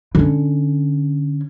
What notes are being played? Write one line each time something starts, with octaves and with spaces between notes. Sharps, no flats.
D3 C#4